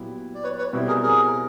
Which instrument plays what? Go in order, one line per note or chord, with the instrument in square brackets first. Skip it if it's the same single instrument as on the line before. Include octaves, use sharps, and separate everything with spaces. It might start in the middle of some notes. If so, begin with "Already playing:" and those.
Already playing: [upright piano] A#2 F#3 B3 E4 G4
[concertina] D5
B4 C#5
B4 C#5
[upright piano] B2 G3 C4 E4
[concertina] G#4 A#4
G#4 A#4